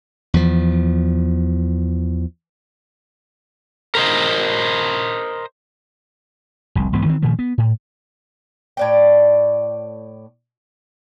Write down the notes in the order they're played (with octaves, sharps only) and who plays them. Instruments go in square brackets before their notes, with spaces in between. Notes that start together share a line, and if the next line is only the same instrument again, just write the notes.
[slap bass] E2 F3
[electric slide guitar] A#4 C5 D#5
[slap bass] F1 C2
B1 G#2 E3 B3
D#3 E3 C4
A#2 D#3 F3 A3
B3
A2
[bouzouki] A2 D5 G5